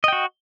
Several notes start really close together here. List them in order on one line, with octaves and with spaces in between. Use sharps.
D#5 G5 F#4